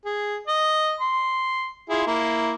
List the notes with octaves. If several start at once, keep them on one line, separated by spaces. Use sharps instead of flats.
G#4
D#5
C6
E4 F4 G#4
A#3 E4